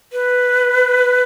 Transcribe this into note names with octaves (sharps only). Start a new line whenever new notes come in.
B4